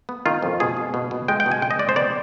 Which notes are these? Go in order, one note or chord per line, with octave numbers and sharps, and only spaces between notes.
B3
D#3 F4
F2
B2 G#4
B2
B2
B2
G#3 G5
G5
B2
G#5
G#3 G5
D#5
G#3 D5
C5
B3 D5